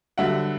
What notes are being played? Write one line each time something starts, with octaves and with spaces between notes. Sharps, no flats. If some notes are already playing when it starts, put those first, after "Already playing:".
G2 D3 F#3 E5 F#5